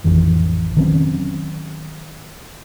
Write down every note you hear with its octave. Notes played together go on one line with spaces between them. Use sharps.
A1 F2 D#3 E3
D#3 F#3 C4 C#4